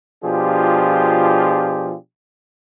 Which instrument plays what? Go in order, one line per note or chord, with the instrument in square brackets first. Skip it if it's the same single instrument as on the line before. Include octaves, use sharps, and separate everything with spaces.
[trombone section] B2 F3 D4 F4 G4 G#4